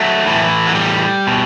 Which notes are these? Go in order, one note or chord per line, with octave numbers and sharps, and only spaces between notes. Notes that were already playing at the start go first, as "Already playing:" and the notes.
Already playing: F#3 A3
A2 E3
F#3
G3
B2